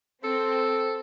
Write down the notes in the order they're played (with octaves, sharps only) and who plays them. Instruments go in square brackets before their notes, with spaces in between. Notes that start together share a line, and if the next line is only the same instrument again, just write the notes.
[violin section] C4 [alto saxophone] A4